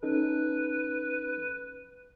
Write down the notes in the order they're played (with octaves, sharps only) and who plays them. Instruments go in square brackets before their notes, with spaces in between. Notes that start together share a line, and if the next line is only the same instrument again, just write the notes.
[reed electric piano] C#4 D#4 A4 [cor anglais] B4